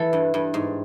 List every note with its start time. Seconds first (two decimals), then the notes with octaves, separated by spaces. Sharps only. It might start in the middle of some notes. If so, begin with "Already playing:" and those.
Already playing: E3 A4
0.13 G2
0.34 G2
0.54 G#2